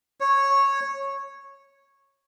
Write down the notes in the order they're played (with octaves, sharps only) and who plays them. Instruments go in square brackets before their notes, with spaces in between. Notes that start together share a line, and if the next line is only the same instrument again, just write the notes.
[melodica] C#5